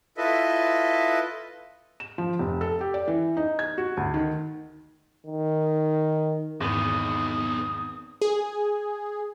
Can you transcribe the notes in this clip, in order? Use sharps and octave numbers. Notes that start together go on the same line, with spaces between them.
E4 F4 A4 B4 D#5 E5
E7
F3
F1
A4
G4
D5
E3
D#4
G#6
F#4
D2
D#3
D#3
G#1 E2 B3 D#4 D#6
G#4